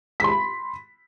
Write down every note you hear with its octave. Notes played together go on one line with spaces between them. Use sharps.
B5 C6 B6